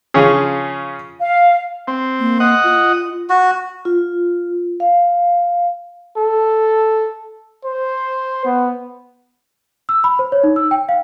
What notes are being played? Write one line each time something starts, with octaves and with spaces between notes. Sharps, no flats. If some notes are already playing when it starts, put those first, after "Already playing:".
C#3 F3 C#4 G#4
F5
C4
A#3
D#5 F#5
F4
F#4
F4
F5
A4
C5
B3
E6
B5
C5
C#5
D#4
E6
G5
F5